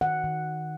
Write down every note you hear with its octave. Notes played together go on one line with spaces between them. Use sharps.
D#3 F#5
D#3